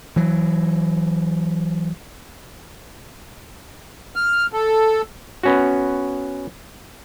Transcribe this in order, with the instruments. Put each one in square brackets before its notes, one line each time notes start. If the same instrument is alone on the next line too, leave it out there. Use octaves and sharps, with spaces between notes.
[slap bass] E3 F#3
[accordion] F6
A4
[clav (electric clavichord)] B3 C#4 F#4